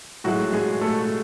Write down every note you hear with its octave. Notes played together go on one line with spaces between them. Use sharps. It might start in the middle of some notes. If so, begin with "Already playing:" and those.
A2 F#3 G#3 F#4
G#3 G#4
A3 A4